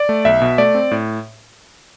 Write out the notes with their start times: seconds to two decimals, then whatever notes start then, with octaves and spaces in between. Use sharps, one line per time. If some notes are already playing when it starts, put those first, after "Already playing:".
Already playing: D5
0.09 A3
0.25 B1 E5
0.41 B2
0.58 A3 D5
0.75 C4
0.91 A2